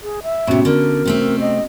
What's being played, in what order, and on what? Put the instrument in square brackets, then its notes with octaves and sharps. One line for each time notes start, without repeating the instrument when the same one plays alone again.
[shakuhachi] G#4
E5
[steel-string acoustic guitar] A2 C3 [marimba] B3 C#4 F#4
[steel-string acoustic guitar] D3 [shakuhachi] A#4
[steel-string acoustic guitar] C3 A3 C4
[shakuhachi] D#5